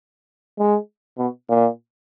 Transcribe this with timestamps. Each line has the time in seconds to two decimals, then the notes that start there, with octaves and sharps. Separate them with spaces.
0.58 G#3
1.18 B2
1.49 A#2